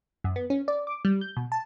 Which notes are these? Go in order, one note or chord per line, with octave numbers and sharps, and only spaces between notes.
F#2
B3
C#4
D5
D6
G3
G6
B2
A5